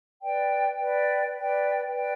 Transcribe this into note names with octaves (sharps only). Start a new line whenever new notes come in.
B4 D5 G5
B4 D5 G5
B4 D5 G5
B4 D5 G5